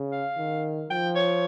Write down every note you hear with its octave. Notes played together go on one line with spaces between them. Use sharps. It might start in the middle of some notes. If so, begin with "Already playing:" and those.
Already playing: C#3
F5
D#3
F3 G5
C#5